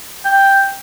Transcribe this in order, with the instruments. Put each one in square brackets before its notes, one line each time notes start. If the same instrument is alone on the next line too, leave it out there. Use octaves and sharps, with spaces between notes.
[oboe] G5